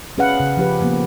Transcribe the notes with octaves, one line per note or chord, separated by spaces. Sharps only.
C#4 G#4 B4 F5 F#5
C#3
F3 G4 B4
F3 A#3 B3